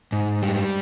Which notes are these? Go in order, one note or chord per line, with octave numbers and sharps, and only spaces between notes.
G#2
G3